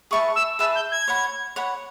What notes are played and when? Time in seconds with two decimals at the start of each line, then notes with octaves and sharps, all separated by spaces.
0.11 G#4 B4 E5 A5 C#6
0.36 E6
0.59 G#4 B4 E5 A5 E6
0.75 G6
0.92 G#6
1.08 C#5 F#5 B5
1.56 C#5 F#5 B5